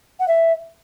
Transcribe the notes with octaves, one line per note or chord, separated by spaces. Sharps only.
F#5
E5